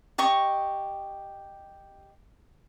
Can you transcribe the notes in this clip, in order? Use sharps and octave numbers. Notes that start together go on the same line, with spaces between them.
G4 D#5 C#6